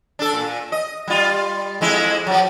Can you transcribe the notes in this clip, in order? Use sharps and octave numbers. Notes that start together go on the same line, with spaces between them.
D4 A4
A#2
D#5
G3 F4
F2 G#3 E4
F3 F#3